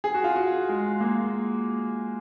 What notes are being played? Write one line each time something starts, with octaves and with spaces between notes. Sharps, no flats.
G#4
F#4
F4
F#4
G#3
A#3